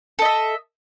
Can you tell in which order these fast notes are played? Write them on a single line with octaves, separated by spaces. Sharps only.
A4 D#5 E5